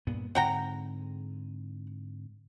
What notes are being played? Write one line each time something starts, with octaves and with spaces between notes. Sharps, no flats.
G2 A#2 B3
G#2 D3 C4 F#5 G5 A#5